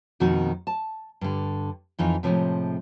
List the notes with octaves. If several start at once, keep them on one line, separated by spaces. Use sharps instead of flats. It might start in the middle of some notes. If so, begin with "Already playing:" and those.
F2 B2 D#3 A#3 D#4 F#4
A5
G2 D3
F2 E3 D#4 F4
A2 C3 F3 G3 G#3